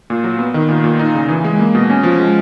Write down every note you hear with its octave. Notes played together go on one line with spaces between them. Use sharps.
A#2
F#3
B3
D#3
A#2
A#2
D#4
C#3
E3
G#3
A#3
B2
C#4
F3
G#3